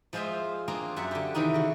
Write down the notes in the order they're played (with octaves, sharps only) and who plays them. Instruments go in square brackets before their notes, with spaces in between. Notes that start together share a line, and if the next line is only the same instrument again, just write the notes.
[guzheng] F3 G#3 F4 C5 D#5 E5
A#3 C4 D4 F4 G#4 A#4
F#2 A4 E5 F#5 A5
D3 G4
C3 D#3 E3 D#4 E4
C#3 F#4